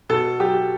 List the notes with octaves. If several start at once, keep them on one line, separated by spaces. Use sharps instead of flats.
B2 A4
F#3 G4